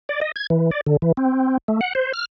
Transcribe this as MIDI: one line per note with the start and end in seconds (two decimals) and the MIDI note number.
0.09 0.20 74
0.21 0.32 75
0.36 0.47 92
0.50 0.71 52
0.71 0.81 74
0.87 0.97 50
1.02 1.12 52
1.17 1.58 60
1.68 1.81 57
1.81 1.93 78
1.95 2.12 72
2.13 2.25 89